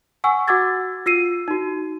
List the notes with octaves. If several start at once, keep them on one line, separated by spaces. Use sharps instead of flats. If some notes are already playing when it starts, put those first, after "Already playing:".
F#5 G#5 C#6 E6
F#4 F#5 D6 E6 G#6 A6
F4 E6 C7 D#7
D#4 F#4